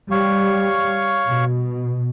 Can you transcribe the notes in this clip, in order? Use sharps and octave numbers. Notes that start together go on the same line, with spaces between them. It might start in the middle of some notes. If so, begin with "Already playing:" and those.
G3 C#5 F5 C#6
B2